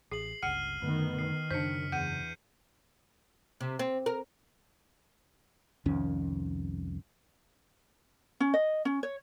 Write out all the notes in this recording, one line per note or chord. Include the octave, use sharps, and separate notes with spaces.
A1 G#4 C7 F#7
G1 C#2 F#5 F6 C7 D#7
F#2 D3 D#3 A3 B3
D#3 C7
F#2 C#3 D4 C5 B6 C#7
E2 F#5 G6 D#7
C3
C4
A#4
C2 F2 D#3 C#4
C#4
D#5
C#4
C#5